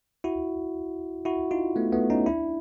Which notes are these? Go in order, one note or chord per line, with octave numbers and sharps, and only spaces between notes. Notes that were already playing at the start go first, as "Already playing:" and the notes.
E4 F#4
E4 F#4
D#4 F4
A3 B3
A3 B3
C#4 D#4
D4 E4